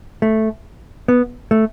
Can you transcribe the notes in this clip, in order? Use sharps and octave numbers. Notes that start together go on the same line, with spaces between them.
A3
B3
A3